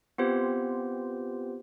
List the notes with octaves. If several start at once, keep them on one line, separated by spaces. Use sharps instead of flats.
B3 C4 F4 G4 B4 C5